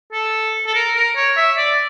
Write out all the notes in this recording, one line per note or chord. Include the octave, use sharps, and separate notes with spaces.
A4
A4
A#4
A#4
C#5
E5
D5